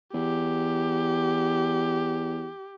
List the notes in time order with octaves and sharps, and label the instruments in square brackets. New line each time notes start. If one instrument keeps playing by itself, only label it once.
[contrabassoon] E2 [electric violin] G4